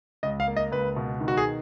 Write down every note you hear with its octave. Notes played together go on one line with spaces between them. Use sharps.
C#2 D#5
F5
A#3
D#5
C#2 B4
B2
D#3
F#4
G#4